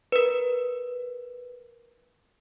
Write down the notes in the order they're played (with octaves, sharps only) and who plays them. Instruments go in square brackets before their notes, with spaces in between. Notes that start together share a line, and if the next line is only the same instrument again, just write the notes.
[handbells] A#4 B4